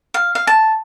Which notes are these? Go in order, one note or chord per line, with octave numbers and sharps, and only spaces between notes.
F5
F5
A5